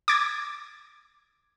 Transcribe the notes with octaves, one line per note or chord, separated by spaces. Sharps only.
D6 G#6 A6